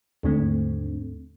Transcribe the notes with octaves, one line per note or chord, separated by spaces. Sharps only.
D#2 G#2 D3 A3 C4